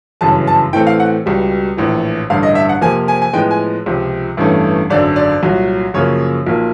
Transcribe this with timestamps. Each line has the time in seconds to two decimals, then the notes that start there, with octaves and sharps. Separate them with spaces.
0.21 G1 F#2 C#3 E3 A5
0.47 A5
0.73 A2 E3 A3 C4 G5
0.87 F5
1.00 F#5
1.26 C#2 B2 G3
1.77 A#1 A2 E3
2.30 A1 G2 D3 F5
2.43 D#5
2.55 E5
2.69 F#5
2.81 F2 C3 F3 A#3 G#5
3.08 G#5
3.22 G#5
3.33 A2 F3 G#3 B3 G5
3.51 G#5
3.86 C#2 C3 F3
4.37 A1 G2 E3 A3 C#4
4.90 G#1 F#2 D3 D5
5.16 D5
5.42 C2 A#2 F#3
5.94 F#2 C#3 F3 A#3 C#5
6.46 B1 A#2 F3 A#3